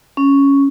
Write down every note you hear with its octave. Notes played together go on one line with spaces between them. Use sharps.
C#4